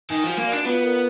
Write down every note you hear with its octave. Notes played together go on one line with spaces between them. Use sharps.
D#3 G#5
F3
F#4
A#3
D5
D4
B3 F4
A#4